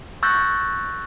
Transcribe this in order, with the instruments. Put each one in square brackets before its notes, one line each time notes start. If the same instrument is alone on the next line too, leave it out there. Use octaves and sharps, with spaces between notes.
[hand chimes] C#6 E6 F#6 G6 A6 A#6